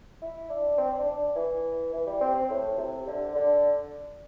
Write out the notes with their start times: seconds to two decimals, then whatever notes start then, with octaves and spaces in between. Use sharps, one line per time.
0.22 E4
0.50 D4
0.78 C4
0.93 D4
1.07 D4
1.36 E3
1.93 E3
2.06 G3
2.21 C4
2.35 C4
2.50 A2
2.78 C3
3.07 D3
3.35 D3